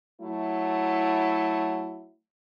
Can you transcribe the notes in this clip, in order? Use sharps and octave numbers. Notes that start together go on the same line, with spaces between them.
F#3 A3 E4